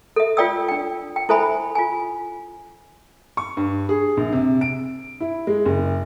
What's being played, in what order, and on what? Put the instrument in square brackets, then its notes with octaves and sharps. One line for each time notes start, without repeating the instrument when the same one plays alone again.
[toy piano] A4 E5
F4 C#5 D5 G5 D#6 E6
D4 G5
G5
E4 A4 C5 E5 G#5 B5
F4 G#5
[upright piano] C#6
G2
G#4
A#1
C3
D7
E4
G#3
F#1